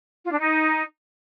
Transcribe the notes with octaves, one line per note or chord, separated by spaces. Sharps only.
F4
D4
D#4